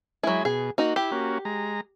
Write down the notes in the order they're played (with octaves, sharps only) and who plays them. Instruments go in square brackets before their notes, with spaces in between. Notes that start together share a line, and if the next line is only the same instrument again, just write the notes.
[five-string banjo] F#3 E4 [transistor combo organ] G#3 G#5
[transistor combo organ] B2 [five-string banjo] G#4
[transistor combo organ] A#3 [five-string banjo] D#4 F#4
[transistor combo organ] E4 [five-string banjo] G4
[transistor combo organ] A#3 C#4 F#4
G#3 A#5